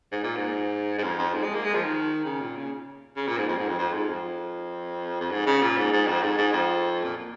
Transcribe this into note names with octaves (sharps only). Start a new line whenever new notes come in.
G#2
A#2
G#2
G#2
F2
F2
G#2
G#3
A#3
G#3
F3
D#3
C#3
A#2
C#3
C#3
A#2
G#2
F2
G#2
F2
F2
G#2
F2
F2
G#2
C#3
A#2
G#2
G#2
F2
G#2
G#2
F2
A#2